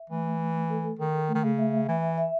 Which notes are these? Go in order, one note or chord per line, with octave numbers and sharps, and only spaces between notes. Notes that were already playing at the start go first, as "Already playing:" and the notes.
Already playing: E5
E3 A3
A3
A4
D#3 A4
A3
D#3
C#3
E5
E3 E5
E5